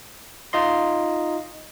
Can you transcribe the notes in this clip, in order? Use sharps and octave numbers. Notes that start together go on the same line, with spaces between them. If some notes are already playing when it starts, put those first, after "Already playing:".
D#4 F4 D#5 C6